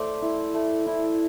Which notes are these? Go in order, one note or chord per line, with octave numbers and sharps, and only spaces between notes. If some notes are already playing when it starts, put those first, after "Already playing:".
Already playing: A3 C5 D5
E4
A3
E4